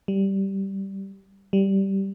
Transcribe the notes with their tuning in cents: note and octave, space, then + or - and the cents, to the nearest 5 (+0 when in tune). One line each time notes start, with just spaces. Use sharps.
G3 -10
G3 -10